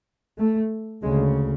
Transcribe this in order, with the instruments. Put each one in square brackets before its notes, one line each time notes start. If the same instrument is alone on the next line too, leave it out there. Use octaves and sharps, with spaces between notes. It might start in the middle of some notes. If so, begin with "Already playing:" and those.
[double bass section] A3
D2 C#3 G#3